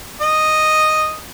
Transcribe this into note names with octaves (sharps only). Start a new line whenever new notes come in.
D#5